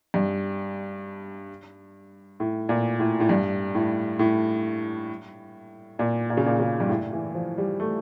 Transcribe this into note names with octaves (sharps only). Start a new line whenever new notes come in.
G2
A2
A#2
A2
A2
G2
A2
A2
A#2
A#2
C#3
A#2
C#3
G2
A2
E3
F3
G3
A3